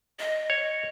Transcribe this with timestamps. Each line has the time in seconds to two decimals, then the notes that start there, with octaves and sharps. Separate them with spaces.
0.19 D#5
0.50 C#5